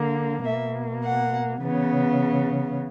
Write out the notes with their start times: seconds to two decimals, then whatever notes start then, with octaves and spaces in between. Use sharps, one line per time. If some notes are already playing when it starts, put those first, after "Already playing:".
Already playing: D3 A#3
0.45 B2 A#3 E5
1.03 F#5
1.61 C#3 E3 B3